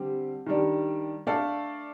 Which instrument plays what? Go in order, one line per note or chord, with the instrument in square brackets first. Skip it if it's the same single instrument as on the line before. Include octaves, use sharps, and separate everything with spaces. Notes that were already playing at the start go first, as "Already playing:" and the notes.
Already playing: [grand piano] D3 G3 C4 G4
D#3 G3 D4
A3 D4 A4 D5 F5